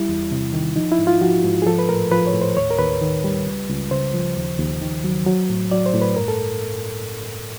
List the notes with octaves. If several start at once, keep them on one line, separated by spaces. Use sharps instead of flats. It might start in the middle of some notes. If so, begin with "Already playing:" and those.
Already playing: G3 E4
E2
C3
D#3
F3 D#4
E4
G#2
F4
F3 F#4
G#2
G#4
F3 A4
B4
A2 A#4
F3 B4
C#5
A2
C5
D#2 C#5
A#4
D#2 B4
D#3
G3
C#2
C#2
C#3 C5
F3
D#2
D#2
D#3
F#3
F#3
A2
F#3 D5
C5
A2
B4
G2 A#4
A4